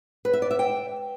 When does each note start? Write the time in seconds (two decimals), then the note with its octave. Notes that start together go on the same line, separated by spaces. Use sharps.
0.25 B4
0.33 E5
0.42 D5
0.51 E5
0.59 G5